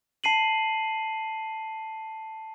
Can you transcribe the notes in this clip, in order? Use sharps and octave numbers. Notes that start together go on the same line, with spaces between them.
A5 C7 D#7 F#7